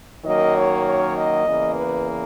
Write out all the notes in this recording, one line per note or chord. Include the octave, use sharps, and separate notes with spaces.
F#2 D#3 F#3 A#3 D#5
C#5
C#5
D#5
E2 C#3 E3 A#3
B4